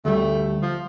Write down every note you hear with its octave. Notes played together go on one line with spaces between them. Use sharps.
D2 G3 A3
F3